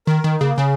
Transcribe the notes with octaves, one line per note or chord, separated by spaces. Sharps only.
D#3 A#4
D#3 D#4
C#3 A#3
C#3 C#4